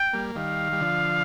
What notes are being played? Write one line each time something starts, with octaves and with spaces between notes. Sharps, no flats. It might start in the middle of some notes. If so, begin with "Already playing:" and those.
Already playing: G5
G3 A#3
D#3 G3 F5
G3
D3 F3